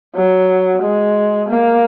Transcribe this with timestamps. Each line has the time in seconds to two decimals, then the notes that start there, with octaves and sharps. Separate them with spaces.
0.15 F#3
0.82 G#3
1.48 A#3